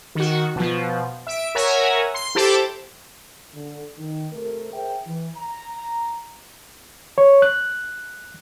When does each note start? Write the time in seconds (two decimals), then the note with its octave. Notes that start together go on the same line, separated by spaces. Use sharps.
0.15 D#3 F#4
0.56 B2 F3
1.27 E5 D7
1.55 A#4 C#5 E5 F#5 G#5 A#5
2.14 C6
2.35 E4 G4 A4 C5 A5 D6
3.54 D3
3.98 D#3
4.32 C3 A3 A#4
4.73 G#4 A#4 C5 E5 G5
5.07 E3
5.36 A#5
7.18 C#5
7.42 F#6